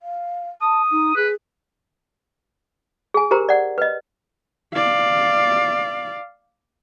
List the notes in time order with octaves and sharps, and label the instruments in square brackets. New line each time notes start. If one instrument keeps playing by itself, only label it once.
[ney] F5
[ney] A5 [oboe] D#6
[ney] D#4
[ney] G#4 [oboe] B4
[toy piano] G#4 G#5
G4 A#4 C5 A#5
D5 F#5
B4 D#5
[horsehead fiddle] D5 F5